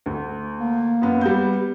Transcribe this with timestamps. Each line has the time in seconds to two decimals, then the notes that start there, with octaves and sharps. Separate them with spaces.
0.06 D2
0.60 A#3
1.02 F#2 B3
1.21 G3 B3 G6